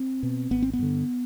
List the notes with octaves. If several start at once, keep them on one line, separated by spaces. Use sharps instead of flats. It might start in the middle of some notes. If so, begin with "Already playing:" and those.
Already playing: C4
B2
G#1 B3
C4
B3
G2 D3